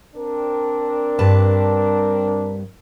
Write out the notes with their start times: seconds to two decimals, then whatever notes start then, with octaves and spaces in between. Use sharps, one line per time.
0.15 C4 D4 A#4
1.19 G2 B4 A5